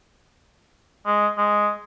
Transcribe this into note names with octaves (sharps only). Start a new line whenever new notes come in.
G#3
G#3